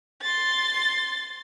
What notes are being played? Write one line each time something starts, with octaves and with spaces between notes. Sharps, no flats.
C6 A6